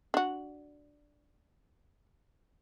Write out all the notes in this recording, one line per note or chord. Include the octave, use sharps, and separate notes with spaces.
D4 F#4